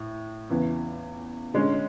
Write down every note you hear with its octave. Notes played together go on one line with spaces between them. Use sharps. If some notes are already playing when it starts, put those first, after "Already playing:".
Already playing: A2
E2 C#3 E3
D3 G#3 C#4